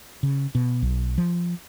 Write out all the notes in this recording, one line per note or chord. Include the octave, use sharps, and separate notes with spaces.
C#3
B2
B1
F3